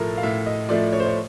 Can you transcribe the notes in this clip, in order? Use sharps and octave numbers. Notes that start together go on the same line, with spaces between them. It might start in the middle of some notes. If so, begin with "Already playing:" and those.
Already playing: A2 F3 A3 A4 A#4
F5
A2 E5
D#5
F3 A3 D5
C#5
C5
C#5